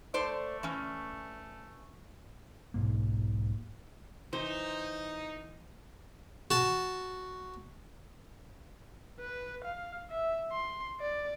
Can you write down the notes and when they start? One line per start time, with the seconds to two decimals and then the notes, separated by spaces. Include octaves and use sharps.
0.14 A3 A4 C5 D5
0.63 E3 C#4
2.74 E1 B1 G#2 A#3
4.33 E3 D#4 C5
6.51 F#4 A5
9.20 B4
9.64 F5
10.10 E5
10.52 C6
11.00 D5